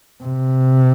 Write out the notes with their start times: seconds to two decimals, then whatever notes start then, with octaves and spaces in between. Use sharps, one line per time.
0.24 C3